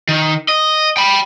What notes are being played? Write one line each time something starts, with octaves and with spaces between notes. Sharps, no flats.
D#3
D#5
G5 B5